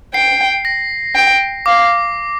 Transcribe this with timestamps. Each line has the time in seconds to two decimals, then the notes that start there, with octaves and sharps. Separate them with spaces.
0.14 G5 C7
0.65 A#6
1.15 G5
1.66 F5 D6